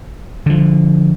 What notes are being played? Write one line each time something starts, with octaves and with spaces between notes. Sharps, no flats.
D3 F3